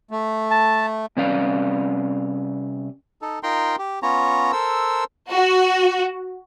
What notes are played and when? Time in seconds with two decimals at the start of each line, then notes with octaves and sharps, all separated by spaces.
0.11 A3
0.51 A5
1.17 C3 G3 C#4 B4 D5 F5
3.22 D#4 A4
3.43 D#4 F4 A#4 G5 A#5 C6
3.79 G4
4.03 B3 C#4 F4 C#5 A#5
4.52 A4 A#4 C5 E6
5.30 F#4